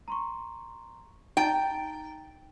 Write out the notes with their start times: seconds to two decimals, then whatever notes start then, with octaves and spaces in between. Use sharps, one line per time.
0.08 A#5 C6 C#6
1.37 D#4 G5 A#5 A6